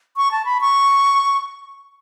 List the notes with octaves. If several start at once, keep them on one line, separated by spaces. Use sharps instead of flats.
C#6
A5
B5
C#6